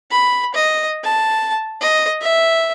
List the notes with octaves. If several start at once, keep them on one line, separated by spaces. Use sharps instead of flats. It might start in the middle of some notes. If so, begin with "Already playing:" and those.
B5
D#5
A5
D#5
E5